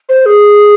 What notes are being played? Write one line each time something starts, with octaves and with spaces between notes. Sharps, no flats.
C5
G#4